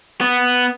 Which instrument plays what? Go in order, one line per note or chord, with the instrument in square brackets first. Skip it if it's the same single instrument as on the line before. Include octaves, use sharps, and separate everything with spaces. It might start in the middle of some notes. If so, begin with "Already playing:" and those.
[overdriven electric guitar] B3